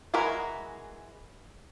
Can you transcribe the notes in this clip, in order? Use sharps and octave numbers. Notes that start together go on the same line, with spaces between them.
E3 G#3 F#4 A#4 B5